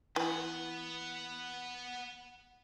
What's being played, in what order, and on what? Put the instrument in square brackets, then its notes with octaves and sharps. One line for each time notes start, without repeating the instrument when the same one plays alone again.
[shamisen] E3 [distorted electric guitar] B4 F#5